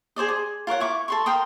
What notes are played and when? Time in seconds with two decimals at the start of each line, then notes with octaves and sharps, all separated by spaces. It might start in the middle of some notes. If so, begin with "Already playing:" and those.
0.16 G#4 C5 D5 D#5
0.29 G#4
0.67 F4 A#4 C#5 F#5
0.80 E4 C#6 D6
1.08 A4 C6 C#6
1.26 A#4 G5 C6 D#6